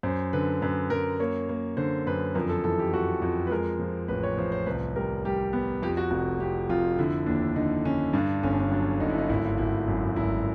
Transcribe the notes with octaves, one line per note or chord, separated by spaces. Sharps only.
F#2 C5
D3 B4
F#2 B4
F#2 A#4
A#3 C#5
A#3
D3 C5
F#2 B4
F2 A#4
A4
E3 A4
G4
F2 F#4
F2
B4
G#3 A#4
F3
A1 B4
C#5
F3 C5
C5
C2 B4
G3 A#4
G3 G4
B3
F2 G4
F#4
F1 F#4
F2 G4
F2 F4
D3 E4
D#2 D4
D3 D#4
D3 C#4
G2 D4
G1 C#4
D4
C#4
F#3 D4
G1 D#4
E4
D#4
G#1 E4
G#1 E4
F#2
G#1 E4